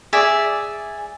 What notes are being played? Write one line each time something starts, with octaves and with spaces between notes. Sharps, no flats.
G#4 D5 E5